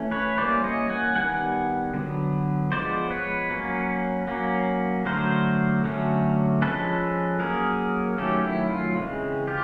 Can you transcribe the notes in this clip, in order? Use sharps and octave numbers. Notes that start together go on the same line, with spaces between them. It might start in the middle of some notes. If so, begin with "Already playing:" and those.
Already playing: E3 A3 C#4
B4 C#5
E3 G3 A#3 C#4 C5 D5
C#5 D#5
F#5 G#5
D#3 G3 B3 F#5 G#5
D3 F#3 B3
F3 G#3 B3 C5 D5
B4 C#5
F#3 A#3 C#4
F#3 A#3 C#4
D3 F#3 A3 A#4 C5
D3 F#3 A3 C#4
F3 G#3 C#4 A4 B4
F#3 A#3 C#4 G#4 A#4
D#3 F#3 A3 C#4 G4 A4
E4
F4
C#3 E3 G#3 C4
F4 G4